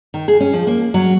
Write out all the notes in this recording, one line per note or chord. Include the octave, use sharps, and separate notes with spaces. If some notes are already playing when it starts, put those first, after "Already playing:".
D#3
G#4
C#4
F3
A#3
F#3